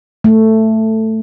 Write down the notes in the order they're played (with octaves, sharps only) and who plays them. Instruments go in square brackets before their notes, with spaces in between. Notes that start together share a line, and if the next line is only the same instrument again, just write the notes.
[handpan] A3